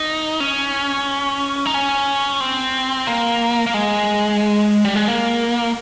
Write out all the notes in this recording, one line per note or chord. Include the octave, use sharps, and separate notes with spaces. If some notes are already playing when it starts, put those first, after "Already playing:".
Already playing: D#4
C#4
D#4
C#4
C4
A#3
A#3
G#3
G3
G#3
A#3